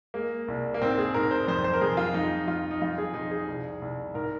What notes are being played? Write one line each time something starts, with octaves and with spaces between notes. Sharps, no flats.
G#3 A#3
C2
A#3
G#2 C4
G#4
G#2 A#4
C5
F2 C5
C5
A#4
F2 G#4
F4
F2 D#4
F2 F4
D#4
F2 F4
G#4
F2 D#4
G#4
C2
C2
G#2 A#4